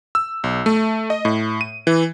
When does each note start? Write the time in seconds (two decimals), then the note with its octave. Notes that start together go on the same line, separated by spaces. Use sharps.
0.15 E6
0.44 B1
0.66 A3
1.10 D#5
1.25 A2
1.61 D#7
1.87 E3